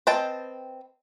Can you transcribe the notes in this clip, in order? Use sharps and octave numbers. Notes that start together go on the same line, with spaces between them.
C4 B4 D#5 G5 A5